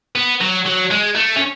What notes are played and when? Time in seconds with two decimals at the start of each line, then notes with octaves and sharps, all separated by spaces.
0.16 B3
0.41 F#3
0.65 F#3
0.91 G#3
1.16 A3
1.37 C#4